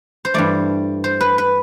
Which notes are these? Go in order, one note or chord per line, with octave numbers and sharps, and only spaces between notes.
C5
G2 E3 A3 D5
C5
B4
B4